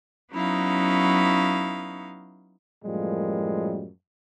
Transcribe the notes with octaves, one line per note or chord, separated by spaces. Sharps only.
F#3 B3 C#4 D#4 E4 F5
F#2 A2 F3 G3 G#3 A#3